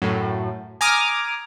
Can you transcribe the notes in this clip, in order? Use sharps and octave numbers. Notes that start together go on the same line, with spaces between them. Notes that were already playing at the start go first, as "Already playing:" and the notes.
F#2 A2
G#5 A#5 D6 D#6 F6